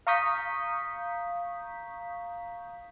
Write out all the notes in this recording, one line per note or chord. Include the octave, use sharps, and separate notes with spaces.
F5 A#5 C#6 D#6 G6 B6